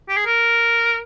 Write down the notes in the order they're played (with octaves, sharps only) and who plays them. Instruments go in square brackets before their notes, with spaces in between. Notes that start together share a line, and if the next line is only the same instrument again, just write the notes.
[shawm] G4
G#4
A#4